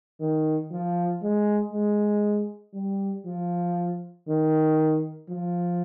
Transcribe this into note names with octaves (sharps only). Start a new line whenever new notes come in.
D#3
F3
G#3
G#3
G3
F3
D#3
F3